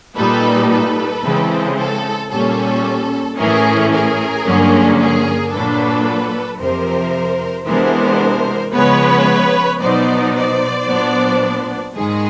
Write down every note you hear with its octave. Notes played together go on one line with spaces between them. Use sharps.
A#2 G3 A#3 D#4 A4 B4
A4 B4
C#3 E3 G#3 C4
A4
A#2 G3 A#3 C#4 A4
A2 E3 A3 C#4 G#4 A#4
G#4 A#4
G2 D3 F#3 A#3 C#4
G#4 A#4
A#2 F#3 A#3 D4 A4 B4
F2 C3 F3 A#4 C5
C3 E3 G#3 B3 D4 A#4 C5
C#3 F3 G#3 B3 B4 C#5
B2 F#3 B3 D#4 C5 D5
C5 D5
A#2 F#3 B3 D4
G#2 D#3 G#3 G#4